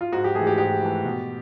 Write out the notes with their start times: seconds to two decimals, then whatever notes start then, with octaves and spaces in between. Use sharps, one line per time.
0.01 F4
0.13 G#2 F#4
0.24 G4
0.35 E3 A3 G#4
0.47 G4
0.58 G#2 G4
0.81 E3 A3
1.04 B2